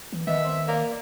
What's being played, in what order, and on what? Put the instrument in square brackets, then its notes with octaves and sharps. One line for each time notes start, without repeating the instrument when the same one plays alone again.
[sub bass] E3
[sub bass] D#3 [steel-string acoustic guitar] B3 D#5 A5 [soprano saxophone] E5
[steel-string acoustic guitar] C4
[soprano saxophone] A#3 [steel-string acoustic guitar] D5